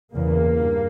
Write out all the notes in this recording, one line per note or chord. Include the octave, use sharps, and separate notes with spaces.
E2 C#3 A#3
G2